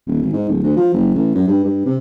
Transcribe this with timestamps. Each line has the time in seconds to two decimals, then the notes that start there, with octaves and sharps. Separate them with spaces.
0.06 D#1
0.22 G#1
0.33 G#2
0.48 D1
0.63 D2
0.76 F3
0.94 F#1
1.14 A1
1.35 F#2
1.47 G2
1.64 G2
1.85 C3